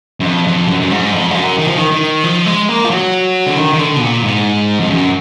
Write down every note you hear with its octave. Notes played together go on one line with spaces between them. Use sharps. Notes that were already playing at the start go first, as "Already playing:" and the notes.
F#2
F2
F2
F#2
F#2
G#2
F2
G#2
F#2
D#3
F3
D#3
D#3
F3
G#3
A#3
F3
F#3
D3
D#3
D#3
D3
B2
A#2
G#2
F2
F#2